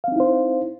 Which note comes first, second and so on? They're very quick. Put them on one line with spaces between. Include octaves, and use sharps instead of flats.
F5 C4 D#4 E4 C5